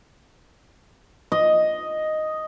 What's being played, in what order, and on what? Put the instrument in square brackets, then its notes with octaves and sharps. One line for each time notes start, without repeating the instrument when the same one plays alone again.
[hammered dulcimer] D#5